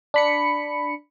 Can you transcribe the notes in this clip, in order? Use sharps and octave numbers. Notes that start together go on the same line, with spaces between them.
D4 B5 C#7